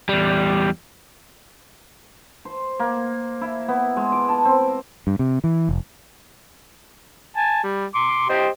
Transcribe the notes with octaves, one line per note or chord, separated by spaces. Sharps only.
E2 G3
C5
A#3
E4
B3
G#3
D6
A5
C4
G2
C3
E3
F1
G#5 A5
G3
C6 D6
G4 C5 D#5